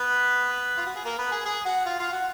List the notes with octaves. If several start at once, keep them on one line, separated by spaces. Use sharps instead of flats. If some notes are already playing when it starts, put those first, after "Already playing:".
Already playing: B3 B4
F4
F#4
G#4
A#3 A#4
B3 B4
G#4 G#5
G#4 G#5
F#4 F#5
F4 F5
F4 F5
F#4 F#5